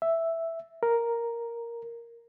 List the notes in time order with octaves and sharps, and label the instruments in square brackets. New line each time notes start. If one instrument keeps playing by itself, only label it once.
[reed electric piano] E5
A#4